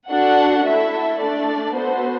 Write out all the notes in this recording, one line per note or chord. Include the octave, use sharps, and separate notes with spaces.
D4 F#4 A4 F#5
A3 E4 A4 E5
A3 D4 A4 D5
B3 F#4 A4 C5